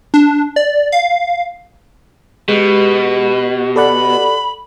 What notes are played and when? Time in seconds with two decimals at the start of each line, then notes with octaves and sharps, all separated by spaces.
0.14 D4
0.56 D5
0.92 F5
2.48 B2 G#3 G4
3.76 A4 D5 F#5 B5